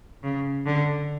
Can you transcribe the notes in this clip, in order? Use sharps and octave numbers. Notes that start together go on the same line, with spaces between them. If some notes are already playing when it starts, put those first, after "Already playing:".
C#3
D3